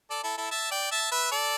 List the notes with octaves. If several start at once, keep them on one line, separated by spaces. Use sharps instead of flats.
A4 D5
E4 A4
E4 A4
E5 A5
D5 G5
E5 A5
B4 E5
A4 D5